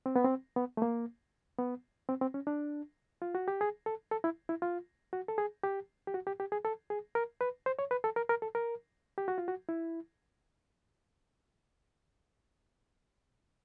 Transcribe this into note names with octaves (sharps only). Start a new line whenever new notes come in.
C4
B3
C4
B3
A3
A#3
B3
C4
C4
C#4
D4
F4
F#4
G4
G#4
A4
A4
E4
E4
F4
F#4
A4
G#4
G4
G4
F#4
G4
G4
G#4
A4
G#4
A#4
B4
C5
C#5
B4
A4
A#4
A#4
A4
A#4
G4
F#4
F4
F#4
E4